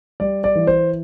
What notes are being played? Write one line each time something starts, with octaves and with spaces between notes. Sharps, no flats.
G3 D5
D5
E3
C5